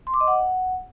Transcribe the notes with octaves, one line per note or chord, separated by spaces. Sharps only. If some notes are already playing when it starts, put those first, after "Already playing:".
C6
D6
D#5
F#5